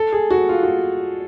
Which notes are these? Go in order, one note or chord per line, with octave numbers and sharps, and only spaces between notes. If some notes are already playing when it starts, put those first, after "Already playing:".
Already playing: A4
G#4
F#4
F4
F#4